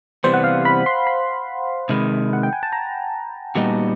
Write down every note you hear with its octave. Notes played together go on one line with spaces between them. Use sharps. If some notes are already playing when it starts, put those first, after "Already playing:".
C3 E3 G3 B3 C5
F#5
F5
B5
C6
B5
C3 D#3 G#3
F#5
G5
G#5
A5
A#5
A#2 G3 B3 D#4 F#4